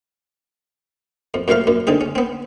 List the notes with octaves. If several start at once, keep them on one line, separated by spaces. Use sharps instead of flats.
F2
F#2 A#2 F3 A3 F5 A#5
F#2 A#2
D3 C4 D#4 G#4
C#4
B3 C4